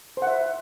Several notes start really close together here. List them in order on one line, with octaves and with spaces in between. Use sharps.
C5 F#5 E5